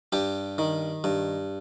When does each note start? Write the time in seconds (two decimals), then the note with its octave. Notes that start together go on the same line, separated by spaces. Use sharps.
0.12 G2 G4
0.58 D#3
1.04 G2